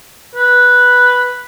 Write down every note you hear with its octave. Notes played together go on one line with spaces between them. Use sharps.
B4